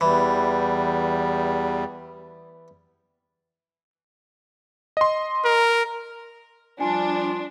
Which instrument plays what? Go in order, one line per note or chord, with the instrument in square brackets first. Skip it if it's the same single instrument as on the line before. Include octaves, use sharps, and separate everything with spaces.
[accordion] E2 G3 [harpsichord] E3
[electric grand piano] D#5 C6
[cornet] A#4
[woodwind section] F3 G3 F4 [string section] D4 [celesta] G#5